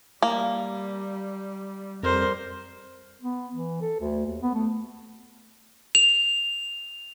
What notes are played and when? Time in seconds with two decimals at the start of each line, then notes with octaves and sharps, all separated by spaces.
0.22 G3 A#3
2.03 F2 G3 A#4 C5
3.22 B3
3.55 E3
3.82 A4
4.01 D2
4.26 D#2
4.42 B3
4.54 A3
5.95 F7